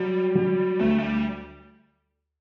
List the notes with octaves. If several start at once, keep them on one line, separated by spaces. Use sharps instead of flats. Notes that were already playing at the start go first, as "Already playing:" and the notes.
Already playing: F#3 G3
F#3
D2 A3
A3
G3